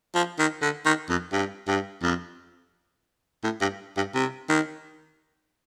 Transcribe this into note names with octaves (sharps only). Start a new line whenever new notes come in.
F3
D#3
D3
D#3
F2
G2
G2
F2
A2
G2
G2
C3
D#3